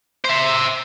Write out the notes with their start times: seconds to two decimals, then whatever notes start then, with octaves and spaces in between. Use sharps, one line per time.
0.25 C5 E5